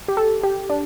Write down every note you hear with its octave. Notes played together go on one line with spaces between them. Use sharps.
G4
A4
G4
D4